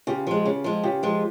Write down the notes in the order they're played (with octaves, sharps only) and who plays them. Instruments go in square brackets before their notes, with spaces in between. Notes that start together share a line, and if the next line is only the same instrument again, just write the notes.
[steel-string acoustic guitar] C#3 [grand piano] F4 G4
[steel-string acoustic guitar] F3 G#3
C#3
F3 G#3
[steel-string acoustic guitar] C#3 [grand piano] F4 G4
[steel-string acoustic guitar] F3 G#3